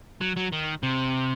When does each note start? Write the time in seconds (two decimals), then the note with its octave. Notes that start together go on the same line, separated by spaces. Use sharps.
0.21 F#3
0.37 F#3
0.53 D#3
0.83 C3